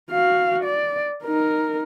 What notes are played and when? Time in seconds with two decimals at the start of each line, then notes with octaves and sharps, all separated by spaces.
0.11 F#4 F5
0.64 D5
1.25 D#4 A#4